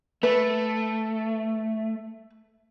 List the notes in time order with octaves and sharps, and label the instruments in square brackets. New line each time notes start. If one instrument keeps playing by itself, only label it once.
[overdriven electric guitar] A3 [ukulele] B4